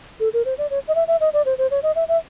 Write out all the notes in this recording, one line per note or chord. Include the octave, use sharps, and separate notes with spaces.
A4
A#4
C5
D5
C#5
D#5
E5
E5
D#5
D5
C5
C5
C#5
D#5
E5
E5